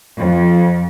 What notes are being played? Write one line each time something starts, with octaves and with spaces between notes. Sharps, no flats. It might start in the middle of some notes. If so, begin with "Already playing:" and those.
F2